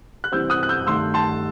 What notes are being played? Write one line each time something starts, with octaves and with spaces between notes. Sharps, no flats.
F#6
C3 E3 G3 C4 E6 G6
D#6 F#6
F#6
E6 G6
G2 D#3 A3 C6 E6
A5 C6